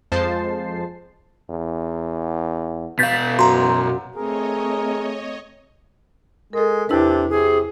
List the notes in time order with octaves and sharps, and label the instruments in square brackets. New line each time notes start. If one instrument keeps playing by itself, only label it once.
[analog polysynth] F2 F3 G#3 C5 A5 C7
[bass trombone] E2
[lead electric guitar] B2 F5 [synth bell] G6 A6 B6
[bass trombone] F#2 [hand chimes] F#4 [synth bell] A#5 C6
[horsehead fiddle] A3 C4 [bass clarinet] G#4 [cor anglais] A#4 [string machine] C#5 D#5
[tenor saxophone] G#3 [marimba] A4 A#4
[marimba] E2 E4 B4 [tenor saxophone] C3 [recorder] D4
[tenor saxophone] C3 [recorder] G#4